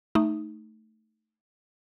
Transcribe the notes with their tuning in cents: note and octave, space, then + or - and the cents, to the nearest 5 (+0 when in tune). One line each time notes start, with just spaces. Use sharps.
A3 +0 D#4 +0